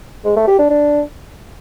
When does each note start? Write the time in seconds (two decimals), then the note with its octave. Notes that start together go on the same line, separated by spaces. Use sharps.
0.25 G#3
0.36 A3
0.48 G4
0.59 D4
0.70 D4